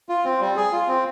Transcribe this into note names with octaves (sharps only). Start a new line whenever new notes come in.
F4
C4
G3
G#4
F4
C4